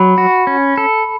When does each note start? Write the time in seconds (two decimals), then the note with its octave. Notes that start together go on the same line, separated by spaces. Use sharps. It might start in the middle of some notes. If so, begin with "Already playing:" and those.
Already playing: F#3 B5
0.18 F#4
0.47 C#4
0.78 A4